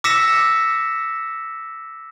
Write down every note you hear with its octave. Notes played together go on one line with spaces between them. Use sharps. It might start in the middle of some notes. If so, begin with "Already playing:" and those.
D6 E6 A#6 B6 C#7 E7